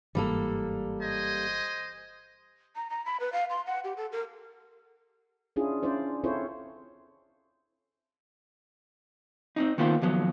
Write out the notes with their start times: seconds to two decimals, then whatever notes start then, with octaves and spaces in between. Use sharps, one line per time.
0.15 G1 G#2 E3 G3 A#3 A4
1.01 C5 D#5 G#5
2.76 A#5
2.90 A#5
3.06 B5
3.20 B4
3.33 F5
3.50 C6
3.67 F#5
3.84 G4
3.97 A4
4.12 A#4
5.56 C#4 D4 E4 F4 G#4
5.83 C#4 D4 E4 C5 D5
6.24 C4 E4 F4 A4 C5 C#5
9.56 C4 D4 D#4
9.78 D#3 A#3 B3 F4 B4 C5
10.02 D#2 F3 F#3 B3